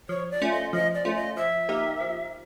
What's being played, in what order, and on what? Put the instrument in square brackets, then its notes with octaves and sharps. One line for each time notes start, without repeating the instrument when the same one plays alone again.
[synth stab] F3 [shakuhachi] C#5
[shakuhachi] D5
[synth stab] A3 C#4 F4
[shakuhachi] D#5
[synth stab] F3 [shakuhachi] D#5
[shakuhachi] D5
[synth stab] A3 C#4 F4
[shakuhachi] D#5
[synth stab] F3 [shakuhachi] E5
[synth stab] A#3 D#4 G4 A#4
F3